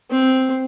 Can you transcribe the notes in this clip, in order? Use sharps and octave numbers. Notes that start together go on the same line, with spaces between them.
C4